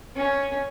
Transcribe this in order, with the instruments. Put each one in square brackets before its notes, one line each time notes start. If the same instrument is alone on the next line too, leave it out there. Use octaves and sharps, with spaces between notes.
[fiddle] C#4